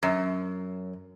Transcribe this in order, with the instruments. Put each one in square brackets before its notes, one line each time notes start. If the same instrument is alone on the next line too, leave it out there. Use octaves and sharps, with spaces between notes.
[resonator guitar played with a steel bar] F#2